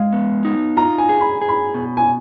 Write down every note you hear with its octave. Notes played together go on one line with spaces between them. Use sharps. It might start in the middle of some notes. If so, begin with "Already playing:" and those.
Already playing: G#3 F5
B3
D#4
F4 A#5
G#5
G#4
B5
G#4
B5
B2
G#5